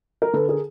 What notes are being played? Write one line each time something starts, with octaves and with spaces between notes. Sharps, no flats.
A#4
D3 A4 B4
G#4 A#4